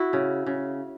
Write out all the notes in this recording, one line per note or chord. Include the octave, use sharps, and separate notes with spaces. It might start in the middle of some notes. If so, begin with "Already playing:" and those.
Already playing: E4 F#4
C#3
C#3